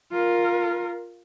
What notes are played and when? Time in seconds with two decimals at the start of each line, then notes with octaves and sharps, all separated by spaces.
0.12 F4 A#4